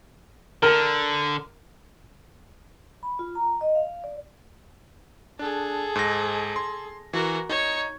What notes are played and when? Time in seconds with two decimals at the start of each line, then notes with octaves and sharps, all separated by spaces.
0.63 D3 A#4
3.03 B5
3.19 F4
3.35 A#5
3.61 D#5
3.75 F5
4.04 D5
5.39 D4 G#4 A4
5.96 G#2 A#6
6.56 C6
7.13 E3 F#4 A#4
7.49 D#4 C#5 C#7